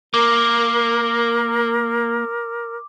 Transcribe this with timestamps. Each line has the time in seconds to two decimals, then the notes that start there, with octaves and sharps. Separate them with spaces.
0.14 A#3 A#4 D6